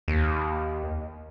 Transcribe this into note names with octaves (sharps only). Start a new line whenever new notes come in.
D#2